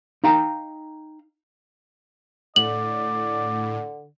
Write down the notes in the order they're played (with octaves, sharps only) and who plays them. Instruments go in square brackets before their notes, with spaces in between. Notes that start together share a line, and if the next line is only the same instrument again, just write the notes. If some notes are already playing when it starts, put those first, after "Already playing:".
[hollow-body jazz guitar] D#4 F5 G5 A#5
[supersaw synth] A2 [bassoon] D3 [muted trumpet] D5 [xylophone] F#7